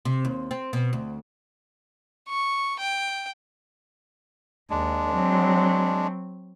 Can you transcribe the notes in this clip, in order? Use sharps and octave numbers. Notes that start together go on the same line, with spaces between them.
C3
D#2
C4
B2
D2
C#6
G5
D#2 G#3 D4
F#3 C4